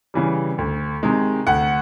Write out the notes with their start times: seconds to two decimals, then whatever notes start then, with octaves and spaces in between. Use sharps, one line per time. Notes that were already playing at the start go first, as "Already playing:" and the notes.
0.14 C#3 E3 G3
0.58 D2
1.03 C3 D#3 G#3
1.47 D2 F#5